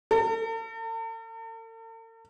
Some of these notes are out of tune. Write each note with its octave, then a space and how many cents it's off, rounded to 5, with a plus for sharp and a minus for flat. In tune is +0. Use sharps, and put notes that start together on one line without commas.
A4 +45